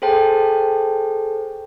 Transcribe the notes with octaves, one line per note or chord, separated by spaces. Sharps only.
G#4 A4 C5 G5 A5